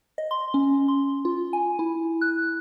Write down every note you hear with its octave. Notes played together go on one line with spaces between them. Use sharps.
D#5
C6
C#4
C6
F4
G#5
E4
F#6